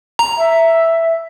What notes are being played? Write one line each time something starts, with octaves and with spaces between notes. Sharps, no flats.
A#5
E5